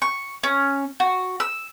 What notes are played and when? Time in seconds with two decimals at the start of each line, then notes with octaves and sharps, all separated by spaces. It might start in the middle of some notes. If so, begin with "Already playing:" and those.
0.02 C#6
0.43 C#4
1.00 F#4
1.40 E6